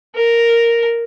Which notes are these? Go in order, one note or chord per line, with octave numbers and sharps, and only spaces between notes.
A#4